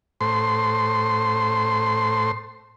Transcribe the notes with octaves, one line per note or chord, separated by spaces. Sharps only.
A2 C5 C6